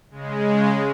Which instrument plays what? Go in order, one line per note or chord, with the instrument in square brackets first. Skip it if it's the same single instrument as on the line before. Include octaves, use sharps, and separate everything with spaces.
[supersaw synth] C#3 G#3